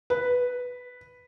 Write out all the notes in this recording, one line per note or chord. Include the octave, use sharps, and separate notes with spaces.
B4